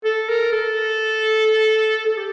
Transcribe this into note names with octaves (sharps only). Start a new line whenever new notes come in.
A4
A#4
A4
A4
G4